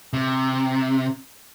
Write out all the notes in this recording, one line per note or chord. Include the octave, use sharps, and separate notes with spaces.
C3